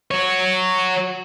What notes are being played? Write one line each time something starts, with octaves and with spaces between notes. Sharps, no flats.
F#4 C#5